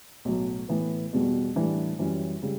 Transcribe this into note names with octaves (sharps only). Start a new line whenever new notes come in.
B1 A2 F#3
A2 E3 B3
E2 B2 G3
A2 E3 G3 D4
F#2 E3 G3 C#4
C#3 G3